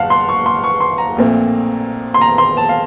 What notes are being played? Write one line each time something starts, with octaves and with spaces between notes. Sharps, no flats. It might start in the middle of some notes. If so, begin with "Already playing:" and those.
Already playing: F#1 F5 F#5 A5
C6
C#6
C6
C#6
C6
A#5
A#1 A#2 A3 C4
C6
A#5
C6
A5
F5